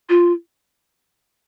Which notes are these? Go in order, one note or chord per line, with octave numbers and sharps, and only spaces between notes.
F4